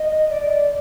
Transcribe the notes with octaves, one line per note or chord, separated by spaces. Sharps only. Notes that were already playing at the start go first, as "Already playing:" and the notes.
Already playing: D#5
D5